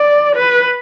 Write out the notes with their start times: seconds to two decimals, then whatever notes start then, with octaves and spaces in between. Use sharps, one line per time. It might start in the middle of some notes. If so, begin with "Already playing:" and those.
Already playing: D5
0.36 B4